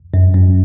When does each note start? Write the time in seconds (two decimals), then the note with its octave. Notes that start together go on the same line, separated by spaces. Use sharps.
0.14 F#2
0.35 F#2